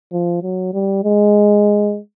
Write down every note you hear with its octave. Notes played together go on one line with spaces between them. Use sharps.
F3
F#3
G3
G#3